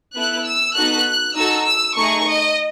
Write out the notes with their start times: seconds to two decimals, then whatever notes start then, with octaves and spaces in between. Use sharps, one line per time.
0.16 B3 E4 A4 F#6
0.46 E6
0.76 B3 D#4 F#4 A4 F#6
1.35 D#4 F#4 A4 E6
1.65 E6
1.95 A3 D#4 G#4 C#6
2.25 D#5